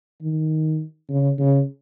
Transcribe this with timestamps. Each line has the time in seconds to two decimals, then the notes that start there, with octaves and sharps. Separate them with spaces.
0.21 D#3
1.09 C#3
1.38 C#3